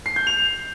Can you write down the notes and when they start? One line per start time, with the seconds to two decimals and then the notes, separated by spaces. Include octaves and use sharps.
0.06 C7
0.16 G6
0.27 F7